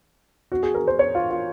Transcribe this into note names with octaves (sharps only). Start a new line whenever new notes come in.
F#4
G#4
A#4
C5
C#5
F4
F4